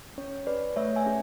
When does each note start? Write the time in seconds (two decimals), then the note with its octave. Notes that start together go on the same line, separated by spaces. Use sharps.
0.18 C#4 C#5
0.47 G#4 B4 D5
0.76 A3 C#5 E5
0.96 E5 G#5
1.06 C#4 G#4